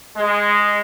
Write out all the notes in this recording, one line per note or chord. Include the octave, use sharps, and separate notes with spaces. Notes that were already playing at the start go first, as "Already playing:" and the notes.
G#3